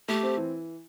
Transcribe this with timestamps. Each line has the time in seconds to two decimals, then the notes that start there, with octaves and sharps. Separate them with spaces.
0.08 A3 G4
0.23 C4
0.37 E3